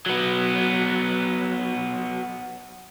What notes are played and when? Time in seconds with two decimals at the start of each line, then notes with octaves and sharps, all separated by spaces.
0.06 F#3 B3